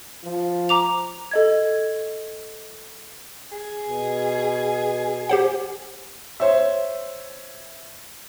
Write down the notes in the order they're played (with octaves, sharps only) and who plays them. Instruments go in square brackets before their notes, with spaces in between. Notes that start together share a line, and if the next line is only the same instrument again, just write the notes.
[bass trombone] F3
[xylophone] A#5 D6 F7
A4 D#5 G#6
[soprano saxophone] G#4
[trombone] B2
[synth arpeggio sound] G4 C5 F#5
[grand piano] C5 C#5 E5